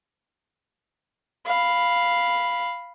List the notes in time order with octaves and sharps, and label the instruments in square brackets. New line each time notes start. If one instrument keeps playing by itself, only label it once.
[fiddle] F5 B5